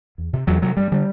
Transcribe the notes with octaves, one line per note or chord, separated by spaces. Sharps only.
E2
C3
E2 F#3
C3 F#3
G2 G3
D3 G3